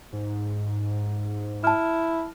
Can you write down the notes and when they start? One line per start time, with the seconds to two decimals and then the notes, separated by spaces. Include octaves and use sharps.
0.13 G#2
1.64 E4 A5 F6